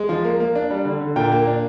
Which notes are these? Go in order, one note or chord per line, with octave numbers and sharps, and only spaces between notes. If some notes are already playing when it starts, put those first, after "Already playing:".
Already playing: G#3
F3
A#3
A#3
D4
G3
D3
D3
A#2 G5
A#3
D4